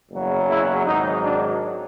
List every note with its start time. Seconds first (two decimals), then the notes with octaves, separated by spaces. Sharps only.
0.11 F#1 E2 C#3 F#3
0.49 E4
0.86 G#1 G#2 D#3 F#3 D#4
1.24 D4